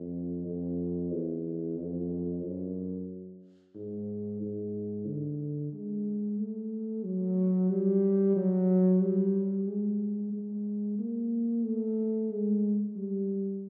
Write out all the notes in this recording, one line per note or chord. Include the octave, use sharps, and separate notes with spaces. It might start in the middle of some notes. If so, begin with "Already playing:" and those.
Already playing: F2
F2
E2
F2
F#2
G#2
G#2
D3
G#3
A3
F#3
G3
F#3
G3
G#3
G#3
A#3
A3
G#3
G3